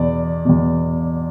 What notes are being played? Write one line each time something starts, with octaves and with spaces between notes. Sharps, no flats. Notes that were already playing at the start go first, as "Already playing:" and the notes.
Already playing: E2 B2 D5
E2 B2